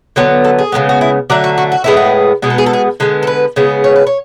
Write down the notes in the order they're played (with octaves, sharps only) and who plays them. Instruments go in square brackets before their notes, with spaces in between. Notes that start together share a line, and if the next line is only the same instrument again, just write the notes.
[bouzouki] D3 F#3 B3
A4
G#4
C#3 E3 G#3 B3
F#4
E4
D3 F#3 A3 D5
F#4
F#4
F#4
A2 G#3 B3 E4
F#4
B2 G#3 B3 G#4
A4
G#4
A4
G#4
D3 G#3 B3
A4
B4
C#3 G#3 B3
C#5
B4
C#5